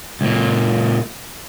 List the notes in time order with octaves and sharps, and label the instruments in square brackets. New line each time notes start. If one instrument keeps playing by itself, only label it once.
[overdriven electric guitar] C#2 A#2